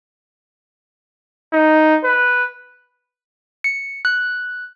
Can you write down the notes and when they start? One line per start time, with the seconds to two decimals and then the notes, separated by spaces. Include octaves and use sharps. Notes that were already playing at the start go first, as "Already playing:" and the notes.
1.53 D#4
2.04 B4
3.64 C#7
4.05 F#6